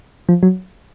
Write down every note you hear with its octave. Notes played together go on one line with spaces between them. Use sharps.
F3
F#3